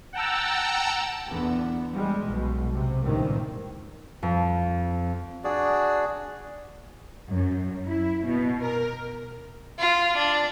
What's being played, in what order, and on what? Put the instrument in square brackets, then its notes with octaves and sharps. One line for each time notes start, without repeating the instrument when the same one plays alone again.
[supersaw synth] F#5 G5 A5 A#5 E6
[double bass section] E2 D3 B3
G3 G#3
B1 B2
C3
C#2 G2 A#2 D#3 E3 C4
[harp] F2
[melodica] D4 F#4 G#4 D5
[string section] F#2
E4
B2
A#4
[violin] F4
D4